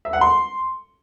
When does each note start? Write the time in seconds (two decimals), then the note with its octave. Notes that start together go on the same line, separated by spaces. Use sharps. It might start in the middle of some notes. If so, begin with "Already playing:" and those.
0.05 E5
0.13 F#5
0.21 C6